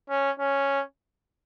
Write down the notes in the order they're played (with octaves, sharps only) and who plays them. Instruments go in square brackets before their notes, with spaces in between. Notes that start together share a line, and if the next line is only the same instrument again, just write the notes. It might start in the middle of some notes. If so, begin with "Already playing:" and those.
[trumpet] C#4
C#4